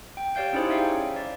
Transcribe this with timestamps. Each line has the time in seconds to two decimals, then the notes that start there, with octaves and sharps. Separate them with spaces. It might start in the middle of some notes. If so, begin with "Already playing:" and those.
0.17 G5
0.35 G4 C#5 D5 F5 G6 D7
0.53 C#4 D#4 E4 G#4 C5
0.69 C#5 E5 F5 G5
1.16 D5